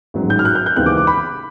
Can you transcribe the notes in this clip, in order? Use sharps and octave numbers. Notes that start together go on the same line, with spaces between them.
A1 G#2 D#3 F#3
G6
F6
F#6
G6
G6
D#2 C#3 E3 G#3 C4 F#6
D6
D6
B5